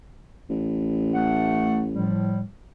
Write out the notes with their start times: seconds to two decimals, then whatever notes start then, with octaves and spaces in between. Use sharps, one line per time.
0.50 A1
1.14 A3 F#5
1.92 A2 F3 G3